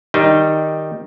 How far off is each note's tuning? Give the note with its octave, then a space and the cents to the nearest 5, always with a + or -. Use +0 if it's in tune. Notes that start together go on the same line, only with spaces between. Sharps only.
D#3 +0 G3 +0 D#4 +0